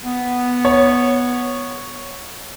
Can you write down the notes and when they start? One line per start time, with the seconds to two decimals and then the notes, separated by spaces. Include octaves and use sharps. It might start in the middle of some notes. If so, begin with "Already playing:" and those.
0.03 B3
0.65 C#5